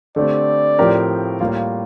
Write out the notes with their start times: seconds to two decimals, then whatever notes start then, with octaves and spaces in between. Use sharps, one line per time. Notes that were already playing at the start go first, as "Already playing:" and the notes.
0.16 D3 A3 C4 G4 D5
0.79 A2 F3 C4 G4 A#4
1.40 A2 G3 A#3 F4 F5